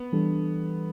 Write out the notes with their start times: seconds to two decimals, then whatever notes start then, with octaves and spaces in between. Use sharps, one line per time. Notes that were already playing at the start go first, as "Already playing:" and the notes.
Already playing: B3
0.12 E3 G3 D4 A4